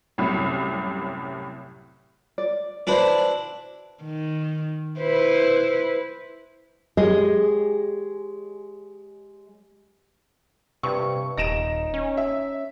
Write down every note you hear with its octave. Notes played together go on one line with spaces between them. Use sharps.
C2 F#2 A2
D5
D4 E4 F#4 B4 C5 D5
D#3
E4 B4 C5
G#3 G4 G#4 C#5 D#5
G2 C3 C#6
D#1 D#4 A#6 D7 E7
C#4
E5